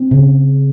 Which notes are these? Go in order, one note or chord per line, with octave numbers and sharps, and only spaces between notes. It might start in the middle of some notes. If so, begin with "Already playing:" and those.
Already playing: C4
C#3